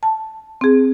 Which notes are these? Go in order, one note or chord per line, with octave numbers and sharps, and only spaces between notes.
A5
C4 G#4